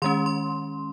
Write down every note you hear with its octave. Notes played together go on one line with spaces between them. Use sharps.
D#3 G#3 C#4 C6
C6